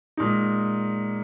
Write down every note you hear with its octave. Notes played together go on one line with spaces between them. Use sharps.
A#2 G#3 D#4